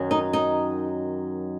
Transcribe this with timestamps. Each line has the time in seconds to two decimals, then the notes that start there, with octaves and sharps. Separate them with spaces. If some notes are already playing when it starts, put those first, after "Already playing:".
Already playing: F#2 D#3 F#3
0.11 D#4
0.33 D#4